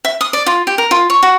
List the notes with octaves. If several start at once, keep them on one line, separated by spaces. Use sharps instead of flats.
E5
D#6
D5
F4
G4
A#4
F4
C#5
F#4